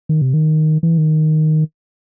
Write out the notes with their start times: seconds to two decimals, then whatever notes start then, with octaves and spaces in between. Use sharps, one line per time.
0.09 D#3
0.22 C3
0.34 D#3
0.83 E3
0.98 D#3